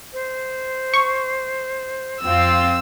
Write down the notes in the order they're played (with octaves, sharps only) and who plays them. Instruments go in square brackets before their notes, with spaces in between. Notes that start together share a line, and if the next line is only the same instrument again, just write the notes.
[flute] C5
[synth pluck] C#6
[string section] F2 C4 F4 [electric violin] E6